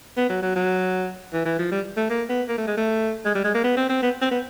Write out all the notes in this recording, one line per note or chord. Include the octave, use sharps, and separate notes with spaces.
B3
F#3
F#3
F#3
E3
E3
F3
G3
A3
A#3
B3
A#3
A3
G#3
A3
G#3
G3
G#3
A#3
B3
C4
C4
B3
C4
B3